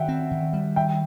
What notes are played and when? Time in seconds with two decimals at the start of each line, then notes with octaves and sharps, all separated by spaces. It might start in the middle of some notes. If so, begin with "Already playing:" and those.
Already playing: D#3 E5 F#5 G5
0.08 C4
0.31 D#3
0.53 G3
0.76 D#3 E5 G5